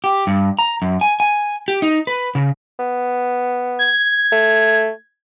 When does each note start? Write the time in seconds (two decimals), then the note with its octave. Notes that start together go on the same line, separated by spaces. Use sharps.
0.04 G4
0.27 G2
0.59 A#5
0.82 F#2
1.01 G#5
1.20 G#5
1.68 G4
1.82 D#4
2.07 B4
2.35 C#3
2.79 B3
3.79 G#6
4.32 A3